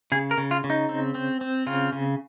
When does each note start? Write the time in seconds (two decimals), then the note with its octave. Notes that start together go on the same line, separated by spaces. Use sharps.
0.12 C#3 G#4
0.31 A#4
0.38 C#3
0.51 F4
0.64 C#3
0.70 D#4
0.89 C4
1.15 C4
1.41 C4
1.67 C#3 F4
1.93 C#3